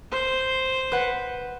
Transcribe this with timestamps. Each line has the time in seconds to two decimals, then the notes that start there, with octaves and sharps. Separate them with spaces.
0.11 C5
0.92 B4 F#5